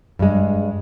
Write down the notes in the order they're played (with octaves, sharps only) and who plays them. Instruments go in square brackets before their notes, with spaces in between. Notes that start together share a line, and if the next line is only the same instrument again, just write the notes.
[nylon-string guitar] G2 G#3